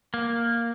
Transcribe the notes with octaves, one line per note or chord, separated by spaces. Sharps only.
A#3